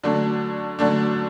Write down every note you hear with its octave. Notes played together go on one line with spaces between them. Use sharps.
D3 F#3 A3 D4
D3 F#3 A3 D4